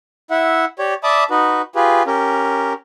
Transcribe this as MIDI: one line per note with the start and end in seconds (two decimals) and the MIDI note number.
0.31 0.65 64
0.31 0.65 76
0.31 0.65 78
0.79 0.94 67
0.79 0.94 73
0.79 0.94 74
1.04 1.24 74
1.04 1.24 76
1.04 1.24 81
1.04 1.24 83
1.04 1.24 86
1.04 1.24 87
1.30 1.62 63
1.30 1.62 66
1.30 1.62 71
1.75 2.03 65
1.75 2.03 67
1.75 2.03 68
1.75 2.03 71
2.07 2.73 61
2.07 2.73 67
2.07 2.73 70